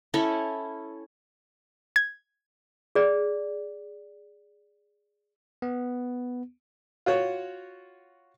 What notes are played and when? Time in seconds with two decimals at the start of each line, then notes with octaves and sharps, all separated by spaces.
0.14 C#4 E4 A4 C#5
1.96 G#6
2.95 G#4 D5
5.62 B3
7.06 F4 F#4 C#5